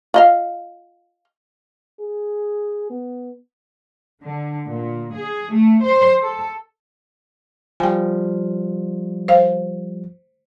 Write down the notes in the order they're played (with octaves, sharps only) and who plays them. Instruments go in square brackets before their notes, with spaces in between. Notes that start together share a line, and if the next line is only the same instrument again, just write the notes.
[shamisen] F4 D#5 F5
[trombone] G#4
B3
[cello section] D3
A#2
G#4
A3
C5
A4
[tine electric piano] F3 G3 [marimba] G5 G#5
[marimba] C5 F5